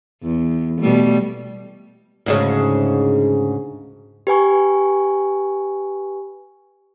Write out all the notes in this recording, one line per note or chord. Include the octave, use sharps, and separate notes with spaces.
E2
B2 G3 A3
D2 G#2 C#3
G4 B4 G#5 C#6